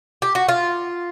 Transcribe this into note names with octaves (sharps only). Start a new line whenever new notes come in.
G4
F#4
F4